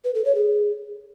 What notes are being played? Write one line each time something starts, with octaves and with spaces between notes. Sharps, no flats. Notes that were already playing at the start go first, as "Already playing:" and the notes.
B4
A4
C#5
G#4